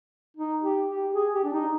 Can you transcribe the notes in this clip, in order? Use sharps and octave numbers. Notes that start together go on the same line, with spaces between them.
D#4
G4
G4
G#4
G4
D4
D#4